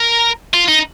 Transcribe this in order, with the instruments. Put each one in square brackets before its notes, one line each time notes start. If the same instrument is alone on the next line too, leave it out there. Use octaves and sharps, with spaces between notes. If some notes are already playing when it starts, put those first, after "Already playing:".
Already playing: [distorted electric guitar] A#4
F4
D#4